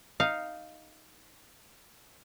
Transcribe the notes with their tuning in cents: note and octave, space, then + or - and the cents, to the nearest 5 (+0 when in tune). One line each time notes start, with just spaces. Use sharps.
D#4 +0 F5 +0